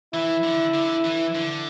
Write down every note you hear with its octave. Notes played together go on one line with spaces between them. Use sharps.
E3 E4
D3
D3
E3
D3